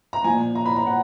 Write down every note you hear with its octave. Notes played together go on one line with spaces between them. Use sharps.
A#5
A#2 F3 G#5
A#5
B5
A#5
F#5